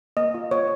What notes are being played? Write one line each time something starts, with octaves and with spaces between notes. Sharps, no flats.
A#3 D#5
F4
A#3 C#5